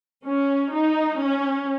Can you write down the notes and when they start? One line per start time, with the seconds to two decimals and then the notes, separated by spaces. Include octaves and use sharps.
0.25 C#4
0.73 D#4
1.23 C#4